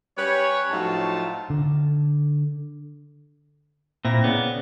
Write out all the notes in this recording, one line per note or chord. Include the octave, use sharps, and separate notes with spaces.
G3 C#4 B4 C#5
A2 F3 F#3 D#4 F4 A5
D3
A#2 C4 E4 A#6
C#3 B3 D5